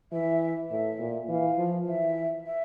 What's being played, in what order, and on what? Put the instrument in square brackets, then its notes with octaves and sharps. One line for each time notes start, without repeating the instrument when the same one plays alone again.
[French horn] E3 [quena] E5
[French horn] A2 [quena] E5
[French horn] A#2
[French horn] E3 [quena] F5
[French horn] F3
[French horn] E3 [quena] E5
[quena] E5